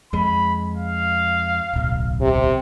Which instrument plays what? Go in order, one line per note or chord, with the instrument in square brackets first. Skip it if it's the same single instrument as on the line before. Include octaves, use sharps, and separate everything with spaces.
[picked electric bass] F2 G#3 [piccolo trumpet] B5
[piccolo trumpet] F5
[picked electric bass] D1 B1
[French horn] C3